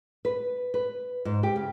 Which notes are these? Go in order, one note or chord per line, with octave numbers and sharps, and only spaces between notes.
B4
B4
G#2
G4
C#3